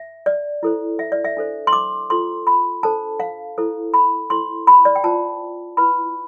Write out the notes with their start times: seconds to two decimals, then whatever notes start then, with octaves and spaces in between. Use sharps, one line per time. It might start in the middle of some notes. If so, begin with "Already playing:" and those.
Already playing: E5
0.26 D5
0.63 E4 A4 C5
0.99 E5
1.12 D5
1.24 E5
1.37 D4 A4 C5
1.67 C6
1.73 D6
2.10 F4 A4 C5 C6
2.47 B5
2.83 D4 A4 C5 A5
3.20 F5
3.58 E4 A4 C5
3.94 B5
4.30 E4 A4 C5 C6
4.67 B5
4.85 D5
4.96 G5
5.04 F4 C5 A5
5.77 E4 B4 B5